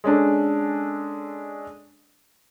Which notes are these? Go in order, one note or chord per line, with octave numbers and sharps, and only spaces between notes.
G#3 C#4 D4 A4